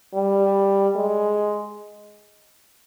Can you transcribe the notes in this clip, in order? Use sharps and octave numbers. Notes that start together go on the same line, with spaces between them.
G3
G#3